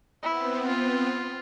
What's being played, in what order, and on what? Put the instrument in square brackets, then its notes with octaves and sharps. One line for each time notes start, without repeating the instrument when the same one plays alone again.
[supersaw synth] B3 C4 [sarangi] E4
[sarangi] F4